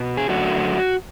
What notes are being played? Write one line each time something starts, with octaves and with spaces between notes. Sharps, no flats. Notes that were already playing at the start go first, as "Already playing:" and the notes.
Already playing: B2
G#4
F#2 D3 A3 F#4